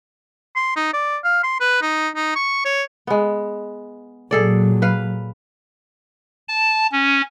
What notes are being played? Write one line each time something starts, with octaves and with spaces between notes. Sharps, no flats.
C6
D#4
D5
F5
C6
B4
D#4
D#4
C#6
C#5
G#3 B3
A#2 F#3 G#4 A4 D5
B4 F5
A5
C#4